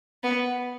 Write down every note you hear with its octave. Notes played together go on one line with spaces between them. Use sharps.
B3